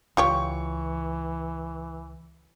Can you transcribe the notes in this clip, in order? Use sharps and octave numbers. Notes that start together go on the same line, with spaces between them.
C#2 E3 F4 G4 C#5 C#6